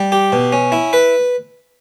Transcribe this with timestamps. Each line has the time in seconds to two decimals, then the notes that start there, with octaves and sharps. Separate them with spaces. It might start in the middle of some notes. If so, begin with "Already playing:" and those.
Already playing: G3
0.12 G4
0.32 B2
0.52 C#4
0.72 E4
0.93 B4